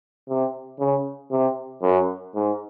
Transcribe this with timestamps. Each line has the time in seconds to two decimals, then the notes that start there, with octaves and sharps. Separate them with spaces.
0.29 C3
0.79 C#3
1.31 C3
1.82 F#2
2.34 G#2